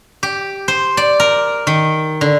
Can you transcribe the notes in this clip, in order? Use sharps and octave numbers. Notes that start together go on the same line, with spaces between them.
G4
C5
D5
A#4
D#3
D3